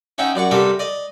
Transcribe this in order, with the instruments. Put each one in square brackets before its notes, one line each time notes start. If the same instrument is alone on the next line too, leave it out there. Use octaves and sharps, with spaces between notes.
[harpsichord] C#4 D#4 E5 F#5 G5
F#2 D5 F#5 C#6
C3 G3 A4 A#4 B5
D5 D#5